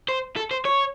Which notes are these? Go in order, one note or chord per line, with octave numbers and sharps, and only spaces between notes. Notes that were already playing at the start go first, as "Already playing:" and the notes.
C5
A4
C5
C#5